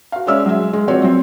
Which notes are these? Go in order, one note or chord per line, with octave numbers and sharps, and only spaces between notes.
F#4 F5
G#3 C#4 D5 E5 E6 F6
F#3 G#3 E5
G#3
F3 C4 F#4 C#5 D5
F#3 C4